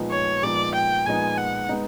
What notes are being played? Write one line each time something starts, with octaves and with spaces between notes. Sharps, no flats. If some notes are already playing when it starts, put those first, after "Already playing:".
Already playing: A#2 F3 G#3 B3 D#4
C#5
A#2 F3 G#3 B3 D#4 D5
G5
A#2 F3 G#3 B3 D#4 G#5
F#5
G#3 B3 D#4